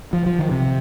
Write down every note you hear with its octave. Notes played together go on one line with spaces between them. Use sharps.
F3
F3
D#3
C3